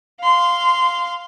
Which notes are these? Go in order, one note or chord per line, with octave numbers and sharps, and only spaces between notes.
F5 C6